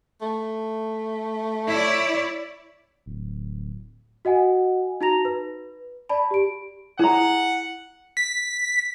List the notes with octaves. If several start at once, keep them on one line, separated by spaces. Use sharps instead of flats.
A3
E4 C#5 D5
D1
F#4 D#5 F#5 G#5
D#4 F#4 A5 A#5 A#6 F7
B4
D5 A5 B5
G4 D7
E4 G#4 F#5 A#5
B6